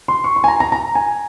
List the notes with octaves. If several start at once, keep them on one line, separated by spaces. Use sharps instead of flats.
C6
C#6
C6
G#5
A#5
A#5
A#5
G#5